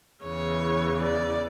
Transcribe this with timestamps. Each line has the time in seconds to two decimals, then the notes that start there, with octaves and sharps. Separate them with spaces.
0.24 E2 C#3 E3 C#5
1.02 D5